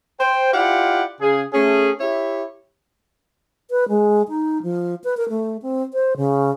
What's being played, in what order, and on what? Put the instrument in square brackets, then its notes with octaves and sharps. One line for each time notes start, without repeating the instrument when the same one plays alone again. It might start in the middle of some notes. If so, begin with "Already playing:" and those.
[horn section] C5 G5
E4 F4 G4 D5 F5 F#5
C#3 G#4
A3 C#4 G#4
E4 G4 C#5 E5
[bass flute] B4
G#3
D#4
F3
B4
A#4
A3
C4
C5
C#3